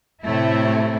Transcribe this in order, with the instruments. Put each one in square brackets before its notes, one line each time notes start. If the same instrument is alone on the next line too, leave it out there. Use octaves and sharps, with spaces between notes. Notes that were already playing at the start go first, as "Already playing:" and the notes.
[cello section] A2 C3 A3 E4